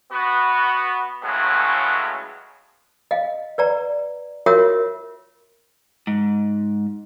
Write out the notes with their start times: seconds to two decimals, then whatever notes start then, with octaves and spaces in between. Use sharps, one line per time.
0.11 B3 F#4
1.23 A2 C#3 F#3 G#3 A3 B3
3.11 D#5 F5
3.58 B4 D5 A#5
4.46 F4 F#4 A#4 C#5 E5 D#6
6.07 G#2